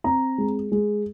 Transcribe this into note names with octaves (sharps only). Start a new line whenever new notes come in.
C4 A#5
G#3
G#3